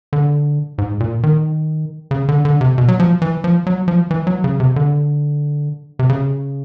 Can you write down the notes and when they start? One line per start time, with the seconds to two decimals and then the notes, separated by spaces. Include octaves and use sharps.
0.13 D3
0.78 G#2
1.00 A#2
1.23 D#3
2.11 C#3
2.29 D3
2.45 D3
2.61 C3
2.78 B2
2.88 F#3
3.00 F3
3.22 E3
3.44 F3
3.67 F#3
3.88 F3
4.11 E3
4.27 F#3
4.44 C#3
4.60 C3
4.76 D3
5.99 C3
6.09 C#3